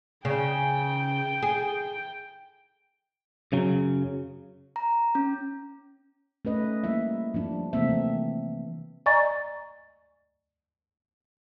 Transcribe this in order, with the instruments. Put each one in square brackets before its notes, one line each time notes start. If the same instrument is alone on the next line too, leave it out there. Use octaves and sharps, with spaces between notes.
[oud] C#3 [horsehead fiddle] G5
[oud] G#4
[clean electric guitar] F#2 C#3 F#3
[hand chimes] A#5
C#4
[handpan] A3 C#4 B4 D#5
G3 A#3 E4 E5
F3 G3 D4
C3 E3 A3 A#3 C4 E5
E3
[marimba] D5 D#5 G#5 A#5 C#6 A6